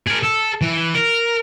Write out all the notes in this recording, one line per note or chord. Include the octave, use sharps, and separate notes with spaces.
G#4 A#4
A4
E3
A#4